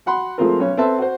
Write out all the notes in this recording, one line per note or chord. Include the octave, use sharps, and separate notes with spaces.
F#4 F#5 B5 C6
F3 G#3 A3 C4 F4 A#4
B1 C#4 C#5
C4 A4 B4 E5 A5
F#4 C5